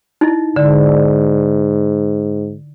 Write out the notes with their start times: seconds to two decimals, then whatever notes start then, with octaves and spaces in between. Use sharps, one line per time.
0.21 D#4 E4 D#5
0.56 G#2 D3 D5